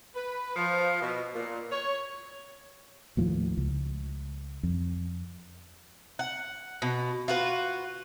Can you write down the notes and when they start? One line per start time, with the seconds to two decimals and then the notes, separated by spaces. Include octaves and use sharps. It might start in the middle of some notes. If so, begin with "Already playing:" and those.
0.15 B4
0.56 F3
1.01 B2
1.35 A#2
1.71 C#5
3.17 D#2 A2 F3
3.58 C#2
4.63 F2
6.19 F#5
6.82 B2
7.28 F4 F#4 B4